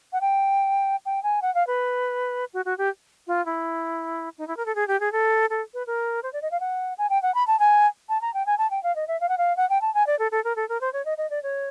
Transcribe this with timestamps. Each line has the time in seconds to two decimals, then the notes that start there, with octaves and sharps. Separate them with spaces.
0.13 F#5
0.21 G5
1.06 G5
1.23 G#5
1.42 F#5
1.55 F5
1.67 B4
2.54 F#4
2.65 F#4
2.78 G4
3.27 F4
3.46 E4
4.38 D#4
4.48 E4
4.57 A#4
4.66 A4
4.75 G#4
4.88 G4
5.00 G#4
5.12 A4
5.50 A4
5.74 B4
5.87 A#4
6.23 C5
6.33 D5
6.42 D#5
6.51 F5
6.60 F#5
6.98 G#5
7.10 G5
7.23 F#5
7.35 B5
7.47 A5
7.59 G#5
8.09 A5
8.22 A#5
8.34 G5
8.46 G#5
8.58 A5
8.71 G5
8.83 F5
8.96 D#5
9.08 E5
9.21 F5
9.29 F#5
9.38 F5
9.57 F#5
9.70 G5
9.82 A5
9.94 G#5
10.07 D5
10.19 A4
10.32 A4
10.44 A#4
10.56 A4
10.69 A#4
10.81 C5
10.93 C#5
11.05 D#5
11.18 D#5
11.30 D5
11.43 C#5